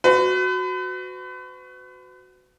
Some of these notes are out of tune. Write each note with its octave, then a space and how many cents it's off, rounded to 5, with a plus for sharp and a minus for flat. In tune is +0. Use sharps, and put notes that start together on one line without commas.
F#4 -5 B4 +40